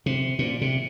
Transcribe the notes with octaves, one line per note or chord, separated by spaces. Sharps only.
C3
A#2
C3